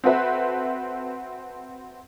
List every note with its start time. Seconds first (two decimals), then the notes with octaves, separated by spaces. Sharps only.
0.04 C4 F#4 A4 B4 E5